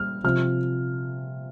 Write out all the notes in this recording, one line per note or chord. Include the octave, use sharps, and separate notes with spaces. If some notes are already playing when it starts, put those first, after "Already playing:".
Already playing: A#2 G3 F6
C3 F3 F6